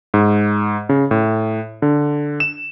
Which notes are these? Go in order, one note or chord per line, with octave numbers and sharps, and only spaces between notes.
G#2
C#3
A2
D3
E7